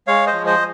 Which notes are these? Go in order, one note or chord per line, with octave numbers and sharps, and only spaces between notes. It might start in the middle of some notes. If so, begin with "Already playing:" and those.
G#3 C#5 F5
C5 D#5
F3
C5 D#5